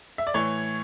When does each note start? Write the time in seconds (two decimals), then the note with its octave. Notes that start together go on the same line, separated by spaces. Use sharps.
0.18 E5
0.27 D5
0.34 A2 E3 C#5